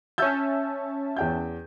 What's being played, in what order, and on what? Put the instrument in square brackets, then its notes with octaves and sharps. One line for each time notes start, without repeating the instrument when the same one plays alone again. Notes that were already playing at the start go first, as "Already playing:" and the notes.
[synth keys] C#4 E5 A5 [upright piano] E6 G6
[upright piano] E2 G5 G6